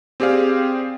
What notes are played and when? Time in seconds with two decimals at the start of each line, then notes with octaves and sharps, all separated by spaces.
0.20 C4 G4 G#4 D5 F5